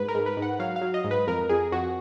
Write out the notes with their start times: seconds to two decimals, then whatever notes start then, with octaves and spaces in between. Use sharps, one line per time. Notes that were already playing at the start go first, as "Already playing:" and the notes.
Already playing: G#2 B4
0.08 A#4
0.15 G#2
0.26 B4
0.37 G#2
0.42 F#5
0.59 F#3 F5
0.76 F5
0.82 F#3
0.94 D#5
1.04 G#2
1.11 B4
1.28 F2 A#4
1.49 F2 G#4
1.72 F2 F#4